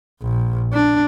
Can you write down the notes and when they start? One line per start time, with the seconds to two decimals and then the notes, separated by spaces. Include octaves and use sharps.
0.21 A#1
0.73 D4